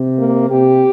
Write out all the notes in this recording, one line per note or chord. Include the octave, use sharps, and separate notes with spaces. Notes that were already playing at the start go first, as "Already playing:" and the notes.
Already playing: C3
A#3
C3 G4